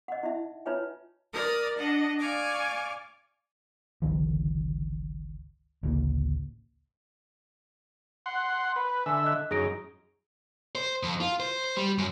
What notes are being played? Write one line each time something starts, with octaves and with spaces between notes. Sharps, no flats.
D#5 F#5
D#4 E4 E5
D#4 F4 B4 C#5 E5 G#5
A#4 D5 D#6 F6
D4 D#5 F#5
D5 F5 G#5 C#6 D6
G1 C#2 D#3 F3
A1 D2 C#3 A#3
F#5 C6
B4
D3 E5 G#5 E6
D#5 F#6
F#2 D#4 G#4 A#6 D7
C5
F2
F4
C5
C5
G3
F#2